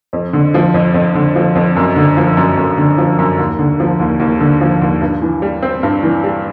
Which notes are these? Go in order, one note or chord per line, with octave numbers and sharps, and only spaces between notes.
F2
D3
F3
F2
F2
D3
F3
F2
F#2
D3
F3
F#2
F#2
D3
F3
F#2
D#2
D3
F3
D#2
D#2
D3
F3
D#2
G2
E3
G3
C4
G2
E3
G3